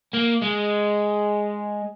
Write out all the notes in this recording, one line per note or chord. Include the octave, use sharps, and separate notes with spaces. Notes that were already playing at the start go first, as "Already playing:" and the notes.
A#3
G#3